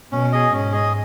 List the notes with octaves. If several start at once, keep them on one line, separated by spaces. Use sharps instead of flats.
B2 C#4
G#4 D#5
G#2 C#4
G#4 D#5